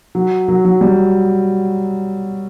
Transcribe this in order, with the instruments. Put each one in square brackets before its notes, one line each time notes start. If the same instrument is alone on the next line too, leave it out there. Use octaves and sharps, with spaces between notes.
[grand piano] F#3
F#3
F#3
G3